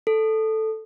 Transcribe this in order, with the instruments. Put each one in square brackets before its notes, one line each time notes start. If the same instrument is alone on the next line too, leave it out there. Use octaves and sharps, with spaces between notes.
[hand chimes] A4